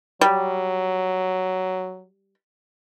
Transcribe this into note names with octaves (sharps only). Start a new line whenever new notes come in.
F#3 G3